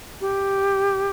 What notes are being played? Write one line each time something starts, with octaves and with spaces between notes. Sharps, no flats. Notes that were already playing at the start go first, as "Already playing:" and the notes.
G4